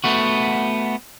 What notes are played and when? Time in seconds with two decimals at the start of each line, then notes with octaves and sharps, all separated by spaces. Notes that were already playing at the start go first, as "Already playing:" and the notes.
0.04 A3 B3 F#4